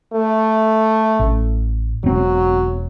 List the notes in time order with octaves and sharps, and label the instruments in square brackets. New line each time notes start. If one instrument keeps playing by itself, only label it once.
[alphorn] A3
[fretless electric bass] A1
[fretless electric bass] E1 C4 [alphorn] F#3